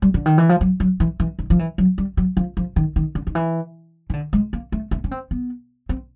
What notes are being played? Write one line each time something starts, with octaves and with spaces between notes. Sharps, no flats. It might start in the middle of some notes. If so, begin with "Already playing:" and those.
G3
D3
D#3
E3
F3
F#3
F#3
E3
E3
D#3
F3
E3
F#3
G3
F#3
F3
F3
D#3
D#3
D3
D#3
E3
D#3
D3
G#3
A#3
A3
A3
C#4
C4
B3
C4